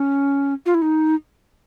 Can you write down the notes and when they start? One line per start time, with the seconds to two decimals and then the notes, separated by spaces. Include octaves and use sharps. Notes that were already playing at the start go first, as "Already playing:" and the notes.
Already playing: C#4
0.66 F4
0.74 E4
0.82 D#4